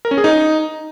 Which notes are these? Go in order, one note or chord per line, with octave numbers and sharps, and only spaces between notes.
A#4
C#4
G#4
D#4